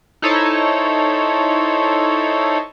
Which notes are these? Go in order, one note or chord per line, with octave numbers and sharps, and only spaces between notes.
D#4 E4 A4 C5 C#5